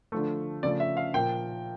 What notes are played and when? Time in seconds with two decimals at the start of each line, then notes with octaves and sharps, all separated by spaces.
0.12 D3 F3 A3
0.63 C#3 F3 A3 D5
0.80 E5
0.97 F5
1.14 A#2 F3 A#3 G5